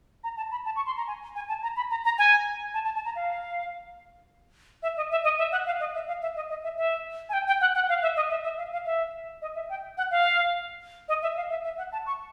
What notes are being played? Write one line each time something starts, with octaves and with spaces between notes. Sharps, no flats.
A#5
A5
B5
A5
C#6
C6
A#5
G#5
G#5
A5
A#5
B5
A#5
A#5
G#5
A5
A5
A5
A#5
F5
E5
D#5
E5
D#5
E5
F#5
F5
D#5
E5
F5
E5
D#5
D#5
E5
E5
G#5
G5
G5
F#5
F#5
F5
E5
D#5
E5
E5
F5
F5
E5
D#5
E5
G5
F#5
F5
D#5
E5
F5
E5
E5
F#5
A5
C#6